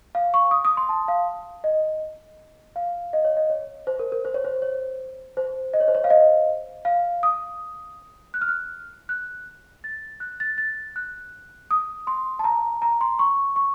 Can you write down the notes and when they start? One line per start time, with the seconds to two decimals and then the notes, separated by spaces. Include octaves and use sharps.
0.15 F5
0.34 C#6
0.51 D#6
0.65 D#6
0.77 C6
0.89 A5
1.08 F5
1.64 D#5
2.76 F5
3.13 D#5
3.25 C#5
3.37 D#5
3.50 C#5
3.87 C5
3.99 A#4
4.12 A#4
4.25 C5
4.34 C#5
4.44 C5
4.62 C#5
5.37 C5
5.74 D#5
5.80 C#5
5.88 C5
5.95 C#5
6.04 F5
6.10 D#5
6.85 F5
7.23 D#6
8.34 F#6
8.41 F6
8.48 F#6
9.09 F#6
9.84 A6
10.20 F#6
10.40 A6
10.58 A6
10.96 F#6
11.71 D#6
12.07 C6
12.39 A5
12.44 A#5
12.82 A#5
13.01 C6
13.19 C#6
13.56 C#6